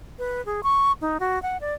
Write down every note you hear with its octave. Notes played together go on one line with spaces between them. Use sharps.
B4
G#4
C#6
D#4
F#4
F#5
D5